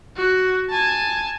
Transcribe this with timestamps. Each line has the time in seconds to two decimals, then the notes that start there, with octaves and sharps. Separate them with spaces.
0.16 F#4
0.70 G#5 A5